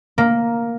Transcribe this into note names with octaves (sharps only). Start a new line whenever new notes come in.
A#3